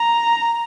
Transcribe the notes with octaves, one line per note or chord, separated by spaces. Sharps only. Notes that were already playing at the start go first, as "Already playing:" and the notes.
Already playing: A#5